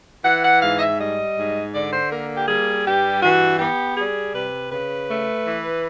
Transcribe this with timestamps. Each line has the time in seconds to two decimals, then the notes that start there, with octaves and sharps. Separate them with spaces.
0.24 E3 F#5
0.43 F#5
0.62 G#2 F5
0.76 D#5
0.80 E5
0.99 G3 D#5
1.37 G#2
1.73 D3 D5
1.92 C5
2.10 A#3 A#4
2.36 G4
2.47 G3 G#4
2.85 G2 G4
3.22 E3 F#4
3.59 B3 G4
3.96 G3 G#4
4.34 C3 B4
4.71 C#3 B4
5.09 A3
5.46 E3